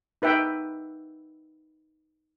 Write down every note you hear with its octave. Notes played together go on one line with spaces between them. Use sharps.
D#4 B4 E5 G5